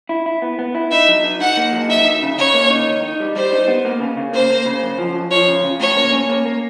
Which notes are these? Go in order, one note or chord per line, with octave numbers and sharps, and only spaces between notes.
E4
E4
B3
B3
E4
D#4 E5
F#3
D#4
D#4 F#5
A#3
F#3
D#4 E5
D#4
C#3
C#3 C#5
A#3
D#4
D#3
D#4
G3
G3 C5
D#4
B3
A#3
C#3
C#3
A#3 C5
A#3
C#3
F#2
F3
F#2
F3 C#5
C#3
C#3
A2 C#5
A#3
C#4
A#3
A#3